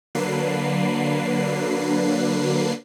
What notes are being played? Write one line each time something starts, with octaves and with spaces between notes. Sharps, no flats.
D3 F#3 A#3 D4 B4 C7